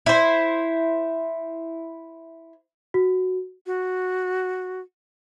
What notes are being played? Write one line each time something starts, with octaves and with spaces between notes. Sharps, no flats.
E4 C5
F#4
F#4